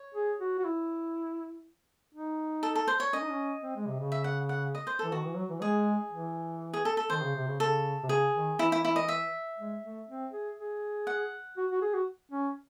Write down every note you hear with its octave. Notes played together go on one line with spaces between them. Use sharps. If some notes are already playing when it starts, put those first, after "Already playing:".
Already playing: C#5
G#4
F#4
F#4
E4
D#4
A4
A4
C5
C#5
C#4 D#5
D#4
C#4
C4
G#3
C3
C#3
E5
F#5
F#5
D#5
C5
E3 A4
D#3 F#4
E3
F#3
E3
G#3 G#4
E3
G#4
A4
A4
D#3 C5
C#3
C3
C#3
C#3 A4
C3
C#3 G#4
D#3
E3 E4
E4
E4
D#5
E5
G#3
A3
C4
G#4
G#4
F#5
F#4
F#4
G#4
F#4
C#4